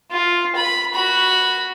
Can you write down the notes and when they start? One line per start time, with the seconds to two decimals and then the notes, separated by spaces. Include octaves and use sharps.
0.11 F4
0.55 B5
0.94 F#4 B5